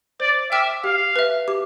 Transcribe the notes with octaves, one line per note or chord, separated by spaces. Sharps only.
C5 D5
E5 G5 D6 F6
G4 F5
B4 E5
G4